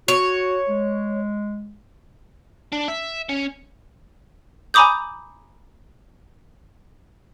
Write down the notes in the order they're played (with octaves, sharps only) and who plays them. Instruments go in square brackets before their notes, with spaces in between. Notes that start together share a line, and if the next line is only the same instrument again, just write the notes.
[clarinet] F#4 [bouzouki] C#5
[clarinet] G#3
[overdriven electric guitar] D4
E5
C#4
[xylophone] G#5 A#5 B5 D6 D#6 G6